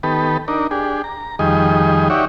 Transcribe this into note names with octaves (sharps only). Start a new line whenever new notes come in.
D#3 B3 G4 A4 B4
D4 D#4 A#4
D4 G4 G#4
A#5
F2 D#3 G3 G#4 D#5
D#4 F#4 G4 C#5 D5 E5